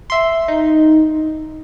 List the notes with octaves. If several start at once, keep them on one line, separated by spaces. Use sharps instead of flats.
E5 C6
D#4